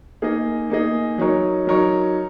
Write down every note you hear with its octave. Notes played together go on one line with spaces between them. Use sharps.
A#3 D#4 G#4 D#5
A#3 D#4 G#4 D#5
F#3 D#4 A#4 C#5
F#3 D#4 A#4 C#5